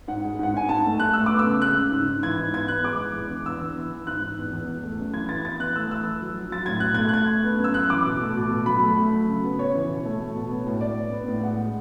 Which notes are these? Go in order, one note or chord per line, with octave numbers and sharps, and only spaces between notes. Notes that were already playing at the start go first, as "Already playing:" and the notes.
G#2 F#5
G#3
G#2 F#5
G#2 G#5
G#2 A5
A3
A3 F#6
A3 E6
B3 D6
E6
C#3
G#3 F#6
C#3
G#2
G#2
E3 G#6
G#2
B3 G#6
B3 F#6
G#3 D6
E3
E2
D3
E2 E6
E2
E3
E3
G#2 F#6
G#2
E2
E2
E2
A3
F#2
E3 G#6
E3 A6
B3 A6
E3 F#6
A3 E6
E3 E6
E3
F#3
F#3
F#3 A6
A2 G#6
B2 F#6
A3 G#6
F#6
A3 G#6
A3
B3
F#2
E6
F#2 F#6
E3 D6
B2
A3
B2
B2
F#3 B5
A3
A3
F#3
C#3
B3
C#3 C#5
E3
B2
A3
A3
B2
B3
A2
A2 D5
B3
B3
A2
G#3 F#5
G#3